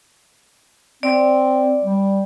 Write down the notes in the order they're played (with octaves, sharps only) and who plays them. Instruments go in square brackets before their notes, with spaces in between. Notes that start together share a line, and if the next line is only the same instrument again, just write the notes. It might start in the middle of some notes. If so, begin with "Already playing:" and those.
[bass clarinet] C4 [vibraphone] D5
[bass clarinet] G3